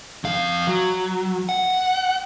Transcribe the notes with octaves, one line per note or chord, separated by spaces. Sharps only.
F2 F5
F#3
F#5